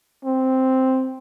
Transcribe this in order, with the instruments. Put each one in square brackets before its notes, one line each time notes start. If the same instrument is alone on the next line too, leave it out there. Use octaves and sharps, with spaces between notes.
[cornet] C4